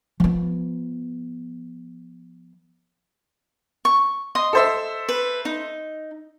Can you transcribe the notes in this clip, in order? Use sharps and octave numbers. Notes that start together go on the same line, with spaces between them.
F3 B3
C#6
D#5 C6 D#6
A4 C5 E5
B4
D#4